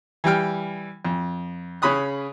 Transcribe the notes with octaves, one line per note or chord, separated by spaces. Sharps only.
E3 G3 G5 F6
F2
C#3 C#4 B5 D#6 F#6